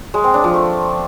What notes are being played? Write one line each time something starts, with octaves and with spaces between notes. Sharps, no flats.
G#3
C4
D4
F3
A3